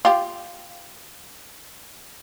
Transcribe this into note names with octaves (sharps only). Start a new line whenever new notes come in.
F4 G4